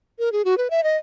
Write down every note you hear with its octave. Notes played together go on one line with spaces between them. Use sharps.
A#4
G#4
F#4
B4
E5
D#5